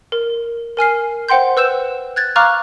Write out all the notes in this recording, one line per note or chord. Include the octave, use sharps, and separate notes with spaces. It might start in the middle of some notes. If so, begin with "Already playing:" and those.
A#4
A#4 G#5 F6 C7
C5 F#5 G5 C6 G6
B4 E6 G6 E7
F#6 G#6 A6
F5 A#5 C#6 D6 F6 F#6